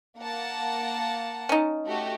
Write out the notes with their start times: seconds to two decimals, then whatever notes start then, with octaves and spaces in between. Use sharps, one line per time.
0.18 A#3 F#5 A5
1.49 C#4 D#4
1.86 A3 F#4 G4